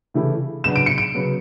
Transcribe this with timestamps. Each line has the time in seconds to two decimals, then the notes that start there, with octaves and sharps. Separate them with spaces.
0.14 C#3 E3 A3 E4 G4
0.64 C#3 F#3 B3 D4 F#4 E7
0.76 D7
0.86 C#7
0.98 D7
1.15 C#3 F#3 B3